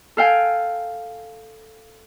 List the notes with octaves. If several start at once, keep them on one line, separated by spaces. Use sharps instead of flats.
A4 F5 G5 G#5